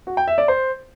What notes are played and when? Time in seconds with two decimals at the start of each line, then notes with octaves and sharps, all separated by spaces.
0.07 F#4
0.17 G5
0.28 E5
0.38 D5
0.48 C5